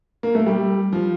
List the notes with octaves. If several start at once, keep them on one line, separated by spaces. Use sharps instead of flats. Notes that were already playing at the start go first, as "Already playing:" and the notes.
A#3
A3
G3
F3